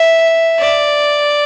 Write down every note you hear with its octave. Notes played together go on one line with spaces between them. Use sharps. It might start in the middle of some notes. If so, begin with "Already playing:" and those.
Already playing: E5
D5